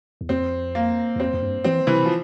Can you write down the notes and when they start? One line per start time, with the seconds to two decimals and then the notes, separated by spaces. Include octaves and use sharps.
0.21 E2
0.29 F2 C4
0.75 A#3
1.16 E2
1.19 F2 C4
1.33 F2
1.42 G2
1.64 E3 C4
1.87 C3 E3
2.06 F3